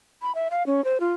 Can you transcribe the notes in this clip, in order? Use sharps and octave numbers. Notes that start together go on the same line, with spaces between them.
B5
E5
F5
C#4
C5
F4